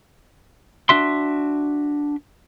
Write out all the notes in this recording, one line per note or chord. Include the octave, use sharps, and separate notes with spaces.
D4 F#4 E5 C6